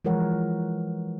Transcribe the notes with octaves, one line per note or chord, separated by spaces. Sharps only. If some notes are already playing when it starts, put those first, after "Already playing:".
E3 F3 G#3 A#4 C#5 F#5